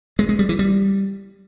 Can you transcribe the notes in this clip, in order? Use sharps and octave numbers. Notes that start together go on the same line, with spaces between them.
G#3
G#3
G3
E3
G3